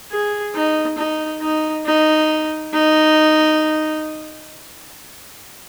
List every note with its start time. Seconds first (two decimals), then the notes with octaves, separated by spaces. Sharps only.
0.12 G#4
0.55 D#4
0.98 D#4
1.42 D#4
1.86 D#4
2.74 D#4